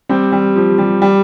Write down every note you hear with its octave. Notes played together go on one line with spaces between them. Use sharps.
G3 C4
G3
F3
G3
G3